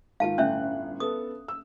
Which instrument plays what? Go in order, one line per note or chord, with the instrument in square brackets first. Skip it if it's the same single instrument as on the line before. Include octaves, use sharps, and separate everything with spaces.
[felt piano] G#2 D#3 F4 [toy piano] F5 A5
[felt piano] G1 A2 F#6 [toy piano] C#4 D4 E5
[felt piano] B3 A4 [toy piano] D#6
[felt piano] E6